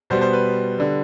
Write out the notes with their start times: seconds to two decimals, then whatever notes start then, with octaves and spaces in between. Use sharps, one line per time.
0.10 B2 G3 B3 C5
0.21 C5
0.33 B4
0.78 D3 G3